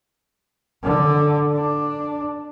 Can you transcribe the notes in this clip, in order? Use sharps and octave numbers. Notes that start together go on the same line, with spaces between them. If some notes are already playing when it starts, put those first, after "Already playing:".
D3
D4